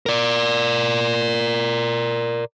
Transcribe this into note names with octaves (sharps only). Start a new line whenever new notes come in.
A#4 D5